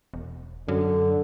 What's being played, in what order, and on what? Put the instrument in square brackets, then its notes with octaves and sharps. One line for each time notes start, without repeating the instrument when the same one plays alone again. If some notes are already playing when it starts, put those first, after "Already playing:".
[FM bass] E1
[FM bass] F#2 [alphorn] D3